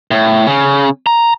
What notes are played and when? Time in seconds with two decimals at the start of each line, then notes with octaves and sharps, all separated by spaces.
0.11 A2
0.47 C#3
1.06 A#5